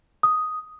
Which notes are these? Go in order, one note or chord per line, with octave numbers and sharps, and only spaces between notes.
D#6